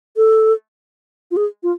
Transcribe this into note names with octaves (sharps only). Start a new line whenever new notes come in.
A4
F4
G#4
F4